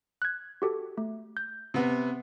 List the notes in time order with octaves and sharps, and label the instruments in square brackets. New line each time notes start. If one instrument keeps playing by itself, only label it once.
[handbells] F#6 G#6
F#4 G4 A4
A3
G6
[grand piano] C3 B3